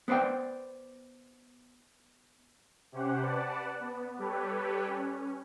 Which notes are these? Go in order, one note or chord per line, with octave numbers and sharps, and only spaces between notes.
B3 B4 C5 D5 G5
C3 C#4 G4 C5 F#5
B4 D5 F#5 A5
B3
G3 G4 A4 B4 C#5
C#4